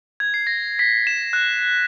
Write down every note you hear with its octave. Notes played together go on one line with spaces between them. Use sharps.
G#6
C7
A#6
B6
E7
F#6